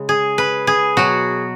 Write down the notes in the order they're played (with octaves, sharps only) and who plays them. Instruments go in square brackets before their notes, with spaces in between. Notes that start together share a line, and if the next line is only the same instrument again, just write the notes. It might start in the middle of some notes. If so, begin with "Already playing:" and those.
Already playing: [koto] C#3 G#3
G#4
B4
G#4
B2 F#3 F#4